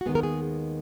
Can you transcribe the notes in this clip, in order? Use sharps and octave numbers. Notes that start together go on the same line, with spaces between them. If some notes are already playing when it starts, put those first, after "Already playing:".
F#4
D#2 D#3 G#3 B3 G#4
A#4
G#4